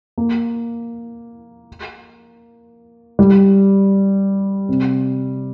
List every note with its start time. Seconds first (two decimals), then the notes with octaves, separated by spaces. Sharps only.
0.18 A#3
3.19 G3
4.69 C3